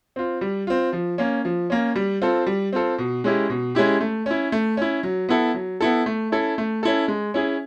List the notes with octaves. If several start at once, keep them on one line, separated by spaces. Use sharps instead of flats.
C4 F4
G3
C4 F4
F3
A#3 C#4
F3
A#3 C#4
G3
C4 F4 A4
G3
C4 F4 A4
B2
G#3 C#4 E4 G4
B2
G#3 C#4 E4 G4
A3
C#4 E4
A3
C#4 E4
F#3
B3 E4 A4
F#3
B3 E4 A4
A3
C#4 E4 A4
A3
C#4 E4 A4
G#3
C#4 E4 G#4